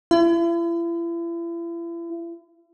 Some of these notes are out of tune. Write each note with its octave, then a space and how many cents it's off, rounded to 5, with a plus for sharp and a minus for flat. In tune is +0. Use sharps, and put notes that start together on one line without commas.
E4 +40